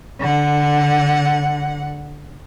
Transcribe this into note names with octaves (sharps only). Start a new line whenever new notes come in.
D3 F#5